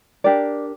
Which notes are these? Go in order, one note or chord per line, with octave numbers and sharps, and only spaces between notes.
D4 G4 A#4 D5